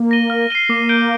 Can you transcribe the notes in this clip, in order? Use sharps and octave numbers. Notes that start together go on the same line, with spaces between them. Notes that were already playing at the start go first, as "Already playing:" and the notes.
Already playing: A#3
A#6 D#7 G7
F6
C7 D#7 G7
A#3 D6
G6 D7 G7